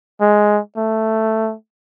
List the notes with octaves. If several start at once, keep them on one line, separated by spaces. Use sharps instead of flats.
G#3
A3